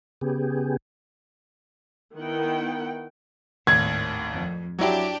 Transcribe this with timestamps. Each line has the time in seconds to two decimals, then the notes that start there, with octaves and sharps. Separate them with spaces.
0.21 C#3 B3 G4 G#4
2.17 D#3 B3 E4 F#5 G5
3.67 G#1 D#2 A2 G#6
4.33 F2
4.79 F#3 D4 E4 G4